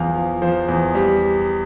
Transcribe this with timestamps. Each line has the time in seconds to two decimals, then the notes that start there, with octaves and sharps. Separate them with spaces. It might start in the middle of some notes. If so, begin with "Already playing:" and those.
Already playing: E2 F3 F5
0.16 F3
0.42 F3 C5
0.68 E2
0.94 G3